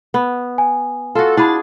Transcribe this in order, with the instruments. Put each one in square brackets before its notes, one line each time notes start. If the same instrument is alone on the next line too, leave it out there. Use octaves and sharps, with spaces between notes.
[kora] B3
[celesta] G#5
[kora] F4 F#4 [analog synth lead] A4
[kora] D4 G#4 [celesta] E4 B5 [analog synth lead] A6